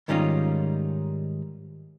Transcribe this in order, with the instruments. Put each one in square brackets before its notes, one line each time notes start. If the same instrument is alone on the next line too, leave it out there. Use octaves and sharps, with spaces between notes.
[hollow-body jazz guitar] G#2 D#3 G3 C#4 D#4 F4